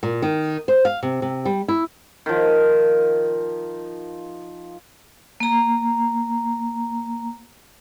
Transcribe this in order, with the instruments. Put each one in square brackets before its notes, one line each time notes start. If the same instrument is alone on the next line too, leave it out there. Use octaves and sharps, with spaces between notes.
[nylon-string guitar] A#2
D#3
C5
F5
C3
C3
G3
E4
[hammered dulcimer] D#3 F3
[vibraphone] A#3 A#5